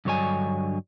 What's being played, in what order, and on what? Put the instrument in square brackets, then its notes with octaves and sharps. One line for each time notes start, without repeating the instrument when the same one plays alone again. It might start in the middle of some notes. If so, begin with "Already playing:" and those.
[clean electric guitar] G2 D3 F#3 C#5 D#5 G#5